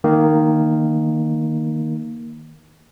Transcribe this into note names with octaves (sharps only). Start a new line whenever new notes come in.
D#3 A#3